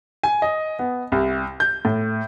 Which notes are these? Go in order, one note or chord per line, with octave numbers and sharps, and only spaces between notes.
G#5
D#5
B3
C2
G6
A2